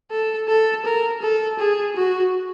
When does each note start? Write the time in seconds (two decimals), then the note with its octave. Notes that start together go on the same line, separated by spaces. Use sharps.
0.11 A4
0.48 A4
0.85 A#4
1.22 A4
1.59 G#4
1.96 F#4